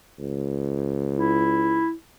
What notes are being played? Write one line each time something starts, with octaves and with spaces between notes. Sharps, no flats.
C#2
E4